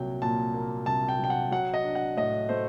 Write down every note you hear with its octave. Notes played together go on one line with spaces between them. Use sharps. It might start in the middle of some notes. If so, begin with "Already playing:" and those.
Already playing: C2 A#2 F#3 A#3 G5
A#2 A5
A#3
C2 A5
G5
F#3 G5
F#5
F#3 F#5
D#5
D4
F#5
A2 D#5
A3 C5